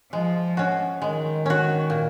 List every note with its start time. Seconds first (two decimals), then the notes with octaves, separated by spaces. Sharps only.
0.13 F3 G#3
0.57 C#4 F#4
1.01 D#3 G#3
1.46 C#4 F#4
1.90 A#2